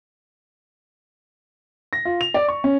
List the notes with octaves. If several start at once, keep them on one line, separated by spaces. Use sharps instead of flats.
A#6
F4
F7
D5
C#6
C#4